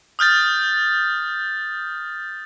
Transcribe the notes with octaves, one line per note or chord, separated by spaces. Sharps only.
D#6 F6 G6 A6